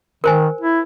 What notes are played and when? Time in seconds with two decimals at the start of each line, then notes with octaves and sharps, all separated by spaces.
0.24 D#3 A#4 C5 G#5
0.61 E4